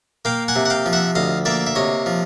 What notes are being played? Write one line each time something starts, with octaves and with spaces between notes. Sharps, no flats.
A#3 F5 G5
F#5 G#5
C3
F#5
F5 G5
F3
E5 F#5
D2 D#5 F5
A#3 D5 E5
E5
C3 C#5 D#5
F3